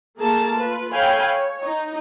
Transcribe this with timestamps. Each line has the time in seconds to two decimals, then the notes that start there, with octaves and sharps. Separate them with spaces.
0.18 A3 A#3 G#4 A#4 A5
0.55 F4 B4
0.92 A4 C#5 F5 G5 G#5 B5
1.25 C#5
1.63 D#4